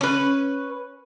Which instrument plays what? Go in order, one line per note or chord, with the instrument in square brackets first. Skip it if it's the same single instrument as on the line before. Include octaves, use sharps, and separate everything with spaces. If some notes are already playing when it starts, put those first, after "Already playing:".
[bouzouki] C#4 B4